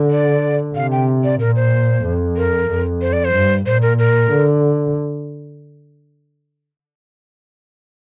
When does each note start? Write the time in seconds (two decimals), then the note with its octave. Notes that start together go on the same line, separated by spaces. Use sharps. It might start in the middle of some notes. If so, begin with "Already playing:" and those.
Already playing: D3
0.11 D5
0.75 C3 F5
0.92 G5
1.24 D5
1.40 A#2 A#4
1.56 C5
2.04 F2
2.37 A#4
2.69 F2
3.01 C5
3.13 D5
3.25 C5
3.34 G2
3.66 A#2 C5
3.82 A#4
3.99 A#4
4.31 D3